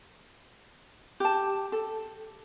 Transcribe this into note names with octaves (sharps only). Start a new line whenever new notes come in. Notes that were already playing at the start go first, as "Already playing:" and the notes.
G4 A5
A4